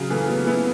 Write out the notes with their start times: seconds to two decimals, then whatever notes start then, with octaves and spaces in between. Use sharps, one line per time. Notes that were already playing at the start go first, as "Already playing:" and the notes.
Already playing: C#3 F#3
0.10 E3 A3
0.28 F#3 B3
0.47 B3 E4